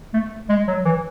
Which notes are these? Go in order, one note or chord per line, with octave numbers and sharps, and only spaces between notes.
A3
G#3
F#3
E3